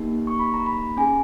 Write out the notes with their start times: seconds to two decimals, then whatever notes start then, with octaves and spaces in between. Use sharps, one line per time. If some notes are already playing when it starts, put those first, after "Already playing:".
Already playing: A#3 D#4 G4
0.27 C#6
0.39 B5
0.54 A#5
0.66 B5
0.97 C#4 G#5
1.00 G#4